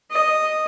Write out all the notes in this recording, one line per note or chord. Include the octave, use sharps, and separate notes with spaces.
D#5